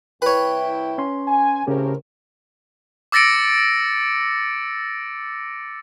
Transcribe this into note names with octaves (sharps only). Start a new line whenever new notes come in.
C2 E4 B4 C#5 G5
C#4 C6
G#5
A2 C#3 C4 C#4 G4 A#4
D6 E6 A6 A#6 C#7 D7